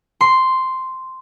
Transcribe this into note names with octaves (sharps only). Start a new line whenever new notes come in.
C6